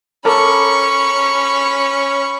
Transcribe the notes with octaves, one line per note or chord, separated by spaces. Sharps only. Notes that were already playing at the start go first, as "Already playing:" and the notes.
C#4 A4 A#4 B5 C#6 D6